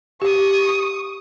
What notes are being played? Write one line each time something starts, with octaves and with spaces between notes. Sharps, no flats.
G4 C#6 D#6